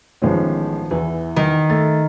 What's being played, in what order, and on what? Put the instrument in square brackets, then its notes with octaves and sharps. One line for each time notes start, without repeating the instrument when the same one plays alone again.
[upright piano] A1 G#3 C#4 [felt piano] D#3 F3 B3
[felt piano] E2 [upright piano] E3
[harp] D#3
[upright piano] A3 [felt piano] A6